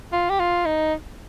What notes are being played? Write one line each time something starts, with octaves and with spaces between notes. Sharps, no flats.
F4
G4
F4
D#4